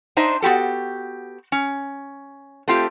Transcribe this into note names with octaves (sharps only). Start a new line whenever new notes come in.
D4 D#4 C5 D#5 E5
B3 F#4 G4 A4
C#4
A3 C4 F4 G4